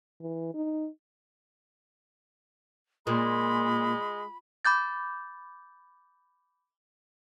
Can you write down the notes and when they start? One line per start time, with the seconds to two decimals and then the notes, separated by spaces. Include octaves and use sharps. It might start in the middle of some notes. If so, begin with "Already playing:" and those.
0.21 E3
0.54 D#4
3.07 A#2 G#3 B5
4.65 B5 D6 G6 A6